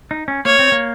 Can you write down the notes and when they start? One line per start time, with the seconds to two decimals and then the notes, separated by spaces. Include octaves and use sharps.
0.11 D#4
0.28 C#4
0.45 A#3 C#5
0.59 C4
0.72 A#3